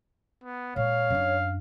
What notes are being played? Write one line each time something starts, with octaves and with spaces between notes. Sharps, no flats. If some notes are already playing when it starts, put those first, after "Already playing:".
B3
A#2 G#3 C#5 F5
F#2 D4